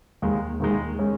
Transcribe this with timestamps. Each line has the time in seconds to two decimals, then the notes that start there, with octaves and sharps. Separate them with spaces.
0.22 D#2 D#3 G#3
0.60 D#2 D#3 G#3
0.99 G#3 C#4